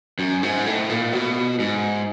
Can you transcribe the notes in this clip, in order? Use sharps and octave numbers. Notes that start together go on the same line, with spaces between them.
F#2
G#2
A2
A#2
B2
G#2